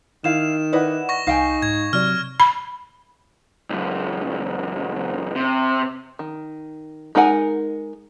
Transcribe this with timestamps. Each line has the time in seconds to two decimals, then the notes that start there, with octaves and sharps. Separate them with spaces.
0.24 D#3 E4 F5 E7
0.73 E4 B4 D5 D#5 F#5
1.09 C#6 A#6
1.27 C2 D#4 F5 G5 G#5
1.62 G#2 G#6
1.93 C3 F#3 D5 F6
2.40 B5
3.70 C#2 F#2
5.36 C3
6.19 D#3
7.15 G#3 D#4 A#4 F#5 G#5